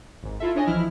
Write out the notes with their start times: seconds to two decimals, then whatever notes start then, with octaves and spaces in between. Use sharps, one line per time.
0.23 G#1 G#2
0.40 E4 F4 A4 E5
0.55 D4 C#5 D#5 G#5
0.67 B1 E3 F3 E4 F6